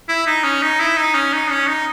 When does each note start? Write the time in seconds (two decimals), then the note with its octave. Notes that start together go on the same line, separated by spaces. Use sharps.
0.09 E4
0.27 D#4
0.44 C#4
0.62 D#4
0.80 E4
0.97 D#4
1.14 C#4
1.33 D#4
1.51 C#4
1.67 D#4